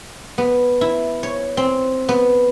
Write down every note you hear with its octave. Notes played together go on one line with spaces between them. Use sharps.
B3
E4
C#5
C4
B3